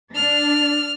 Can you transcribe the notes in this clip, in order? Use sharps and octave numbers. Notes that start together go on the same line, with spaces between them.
D4 F6